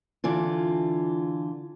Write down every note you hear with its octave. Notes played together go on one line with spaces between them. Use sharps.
D3 E3 F4